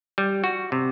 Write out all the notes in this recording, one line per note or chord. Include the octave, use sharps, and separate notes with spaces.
G3
F#4
C3